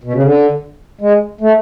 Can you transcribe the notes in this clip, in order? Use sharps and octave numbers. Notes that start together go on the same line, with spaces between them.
B2
C#3
D3
G#3
A3